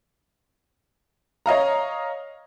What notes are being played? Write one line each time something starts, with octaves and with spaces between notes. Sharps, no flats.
C#5 D#5 F5 A#5